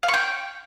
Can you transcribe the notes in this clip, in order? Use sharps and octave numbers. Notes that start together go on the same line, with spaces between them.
F5
C#6
G5